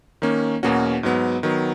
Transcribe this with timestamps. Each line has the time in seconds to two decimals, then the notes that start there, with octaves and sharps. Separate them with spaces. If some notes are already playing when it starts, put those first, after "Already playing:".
0.22 D#3 A#3 C#4
0.63 E2 B2 A#3 C#4 F#4
1.03 G#2 F#3 B3
1.43 D#3 F#3 B3